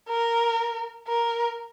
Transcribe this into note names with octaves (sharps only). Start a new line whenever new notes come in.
A#4
A#4